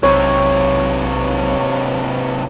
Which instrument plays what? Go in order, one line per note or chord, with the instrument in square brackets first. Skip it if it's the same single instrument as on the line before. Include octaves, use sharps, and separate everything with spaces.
[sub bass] B1 [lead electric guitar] G#2 C3 [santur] C#5 B5